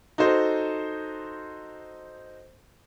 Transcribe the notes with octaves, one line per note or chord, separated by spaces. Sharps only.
D#4 F#4 A4 C5